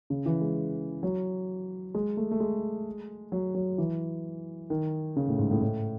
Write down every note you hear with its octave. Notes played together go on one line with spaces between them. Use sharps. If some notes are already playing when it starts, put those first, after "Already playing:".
C#3
E3
G#3
F#3
G#3
A3
A3
G#3
F#3
F#3
E3
D#3
C#3
A2
G#2
A2
A2